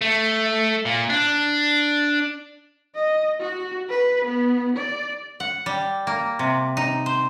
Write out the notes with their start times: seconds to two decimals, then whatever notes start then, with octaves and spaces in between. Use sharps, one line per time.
0.01 A3
0.85 A#2
1.10 D4
2.95 D#5
3.40 F#4
3.89 B4
4.25 B3
4.76 D5
5.40 F#5
5.66 G3
6.07 A#3
6.39 C3
6.77 D#4
7.06 C5